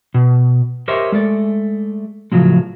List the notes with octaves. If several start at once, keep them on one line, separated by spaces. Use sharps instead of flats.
B2
G4 A#4 C5 C#5 D#5 E5
G#3 A3 D5
A2 C#3 F3 F#3 G#3